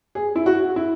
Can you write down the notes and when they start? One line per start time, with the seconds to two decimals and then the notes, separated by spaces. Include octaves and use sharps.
0.15 G#4
0.36 E4
0.46 F#4
0.76 E4